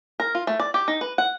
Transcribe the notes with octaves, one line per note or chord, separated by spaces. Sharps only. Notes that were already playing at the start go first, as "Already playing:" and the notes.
A#4
F4
A3
D5
G4
D#4
B4
F#5